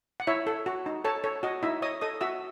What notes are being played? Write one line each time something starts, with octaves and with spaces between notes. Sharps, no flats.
F#5
E4 C#5 E5
A4
F#4
D#4
A4 C#5 A5
A4 C#5
F#4 D#5
D#4 E4 E5
C#5 D#5 D#6
A4 D#5 D#6
F#4 E5 E6